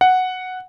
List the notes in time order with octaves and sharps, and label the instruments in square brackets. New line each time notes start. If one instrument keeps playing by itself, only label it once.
[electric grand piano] F#5